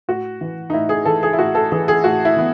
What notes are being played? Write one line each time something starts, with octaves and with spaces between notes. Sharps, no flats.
A2 F#4
E3
D#4
A2 E4
G#4
E3 A4
G#4
E4
A2 F#4
A4
E3 G#4
G#4
A2 F#4
E4
E3 B3